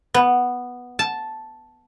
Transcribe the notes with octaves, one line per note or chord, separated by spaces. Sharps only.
B3
A5